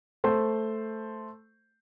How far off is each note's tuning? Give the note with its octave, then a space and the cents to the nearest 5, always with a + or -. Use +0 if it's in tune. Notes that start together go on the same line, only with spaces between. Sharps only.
A3 +0 C5 +0